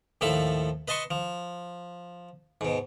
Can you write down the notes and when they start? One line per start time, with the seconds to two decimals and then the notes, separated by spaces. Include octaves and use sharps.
0.21 D#2 A2 F3 A4 A5 B5
0.88 B4 D#5 A5 C6 C#6
1.11 F3
2.61 G#2 B2